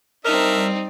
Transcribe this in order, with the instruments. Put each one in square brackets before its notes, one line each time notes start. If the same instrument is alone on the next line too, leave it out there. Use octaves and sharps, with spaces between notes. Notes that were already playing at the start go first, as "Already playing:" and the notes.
[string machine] G3 D5 [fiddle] C4 D#4 [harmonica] D4 E5 [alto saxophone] A#4